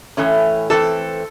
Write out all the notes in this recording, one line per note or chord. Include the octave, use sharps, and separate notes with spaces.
A2 E3 A3 C#4
E3 A3 C4 A4